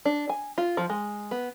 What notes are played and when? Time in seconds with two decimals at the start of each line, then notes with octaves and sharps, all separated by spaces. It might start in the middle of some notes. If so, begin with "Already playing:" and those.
0.05 D4
0.30 G#5
0.58 F4
0.77 F3
0.90 G#3
1.31 B3